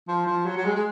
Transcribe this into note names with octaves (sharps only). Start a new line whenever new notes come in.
F3
F3
F#3
F#3
G#3
G#3